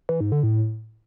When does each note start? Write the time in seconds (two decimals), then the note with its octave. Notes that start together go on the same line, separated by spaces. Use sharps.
0.09 E3
0.20 G#2
0.32 D3
0.43 A2